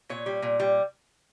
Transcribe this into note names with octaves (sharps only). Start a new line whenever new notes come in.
A#2 C#5
G3
A#2
G3